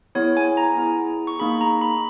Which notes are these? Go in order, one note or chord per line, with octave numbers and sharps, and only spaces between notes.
B3 E4 G#4 C#5
G#5
A#5
B3 E4 G#4
C#6
A#3 D#4 G#4 B5
A#5
B5